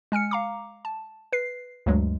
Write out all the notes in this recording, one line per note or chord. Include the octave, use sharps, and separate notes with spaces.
G#3 G#5 F6 C#7
F5 A#5 D6
A5
B4 C7
D2 G2 F#3 G#3